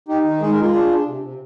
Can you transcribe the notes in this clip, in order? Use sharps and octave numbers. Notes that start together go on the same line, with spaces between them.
D#4 G4
D#3
G#3 G#4
A#4
G#3 F4 G#4
D4
D4
C3
C3